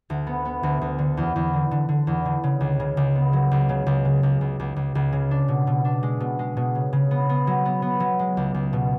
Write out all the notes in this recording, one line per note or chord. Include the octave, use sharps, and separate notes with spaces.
D2
B3
B3
D2
D2
D3
E2
E2
D3
D3
D3
E2
D3
C#3
C#2
C#3
C#2
B3
F#3
C#2
C#3
C#2
C#3
C#2
C#2
C#2
C#2
C#2
C#3
D4
B2
B2
D4
G#3
B2
G#3
B2
C#3
C#3
B3
B3
F#3
B3
B3
F#3
G#3
C#2
C#2
B2